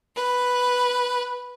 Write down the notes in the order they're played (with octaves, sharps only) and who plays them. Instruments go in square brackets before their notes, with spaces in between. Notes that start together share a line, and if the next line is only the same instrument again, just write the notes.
[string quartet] B4